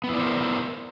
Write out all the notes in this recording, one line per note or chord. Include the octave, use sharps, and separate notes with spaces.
B3 E4 A#4 C5 D5